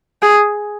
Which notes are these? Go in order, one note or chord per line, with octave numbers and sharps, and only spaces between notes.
G#4